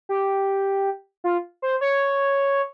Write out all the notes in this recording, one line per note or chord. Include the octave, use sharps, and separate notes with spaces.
G4
F4
C5
C#5